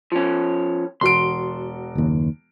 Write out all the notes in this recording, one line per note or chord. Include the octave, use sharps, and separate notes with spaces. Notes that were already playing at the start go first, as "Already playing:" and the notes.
F3 C#4
E1 F#4 C6 D7
F#1 D#2